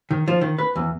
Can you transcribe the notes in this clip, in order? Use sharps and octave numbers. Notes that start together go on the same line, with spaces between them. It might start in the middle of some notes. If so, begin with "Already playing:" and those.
D#3
F3
D#3
B4
E2